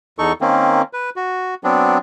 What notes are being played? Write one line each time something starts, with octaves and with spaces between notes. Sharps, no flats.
E2 D#4 A4 C#6
D#3 A#3 C4 C#4
B4
F#4
F#3 B3 C4 D4